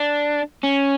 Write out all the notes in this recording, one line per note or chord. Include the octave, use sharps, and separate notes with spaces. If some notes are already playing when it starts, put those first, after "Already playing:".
Already playing: D4
C#4